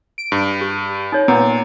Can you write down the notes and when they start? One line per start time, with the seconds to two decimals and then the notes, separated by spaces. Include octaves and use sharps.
0.18 D7
0.32 G2
0.61 G4
1.12 D#4 C#5
1.28 A#2 B3 A#5